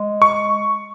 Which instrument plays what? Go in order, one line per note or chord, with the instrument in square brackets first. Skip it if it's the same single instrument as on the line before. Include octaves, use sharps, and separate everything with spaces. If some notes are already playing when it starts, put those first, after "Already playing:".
Already playing: [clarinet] G#3
[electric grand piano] C#6